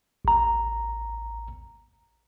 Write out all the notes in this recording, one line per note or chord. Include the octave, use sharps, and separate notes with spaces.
A1 A#5